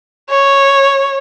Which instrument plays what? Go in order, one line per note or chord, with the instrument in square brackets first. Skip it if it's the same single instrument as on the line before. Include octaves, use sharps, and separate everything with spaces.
[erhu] C#5